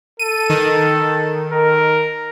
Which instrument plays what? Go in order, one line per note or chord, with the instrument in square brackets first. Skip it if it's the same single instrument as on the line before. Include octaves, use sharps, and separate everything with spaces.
[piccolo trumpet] A4 [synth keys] D#7
[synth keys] D#3
[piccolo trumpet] A#4